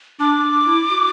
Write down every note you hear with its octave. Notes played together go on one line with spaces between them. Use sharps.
D4 D6
D4
E4
F#4